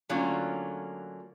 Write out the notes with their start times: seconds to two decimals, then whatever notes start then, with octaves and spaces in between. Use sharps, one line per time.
0.09 D3 F#3 A3 A#3 C#4 F4